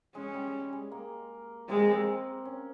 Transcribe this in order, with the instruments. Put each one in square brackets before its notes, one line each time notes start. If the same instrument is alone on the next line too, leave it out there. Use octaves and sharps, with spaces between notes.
[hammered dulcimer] G#3 [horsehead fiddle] C#4
[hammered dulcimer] G3
G#3
A#3
[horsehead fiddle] G#3 [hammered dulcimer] C4
[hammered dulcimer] A#3
C4
C#4